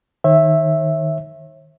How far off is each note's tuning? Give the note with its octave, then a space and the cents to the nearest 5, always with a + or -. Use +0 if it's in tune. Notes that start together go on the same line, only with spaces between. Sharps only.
D#3 +0 C#5 -40 E5 +0